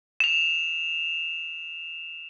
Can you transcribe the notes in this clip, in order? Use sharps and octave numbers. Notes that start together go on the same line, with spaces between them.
E7 F7